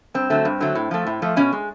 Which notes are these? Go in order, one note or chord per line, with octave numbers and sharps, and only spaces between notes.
G2 C4
D3 F#3 A3
G2
D3 F#3 A3
A2
F3 A3
A2
F3 A3
B2 C#4
G#3